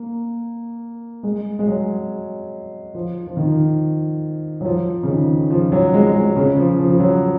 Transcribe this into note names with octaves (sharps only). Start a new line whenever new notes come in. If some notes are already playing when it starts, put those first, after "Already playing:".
Already playing: A#3
G#3
G#3
F#3
F3
F3
D#3
F#3
F3
C#3
D#3
F3
F#3
G#3
G#3
C#3
F3
F3
F3
F#3